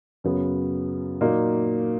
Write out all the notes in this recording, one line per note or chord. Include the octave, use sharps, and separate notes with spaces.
F#2 C#3 F#3 B3
A#2 F#3 A#3 D#4